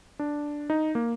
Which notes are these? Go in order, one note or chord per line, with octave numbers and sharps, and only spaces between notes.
D4
D#4
A#3